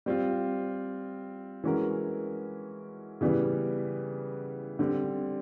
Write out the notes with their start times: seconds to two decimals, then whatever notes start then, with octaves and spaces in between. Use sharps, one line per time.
0.06 G3 C4 F4
1.64 E3 G#3 C#4 F#4 A#4
3.21 C#3 E3 G3 B3
4.79 D3 G3 C4